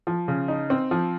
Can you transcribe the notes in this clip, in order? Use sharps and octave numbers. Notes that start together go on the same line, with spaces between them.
F3
C#3
D#4
C4
F3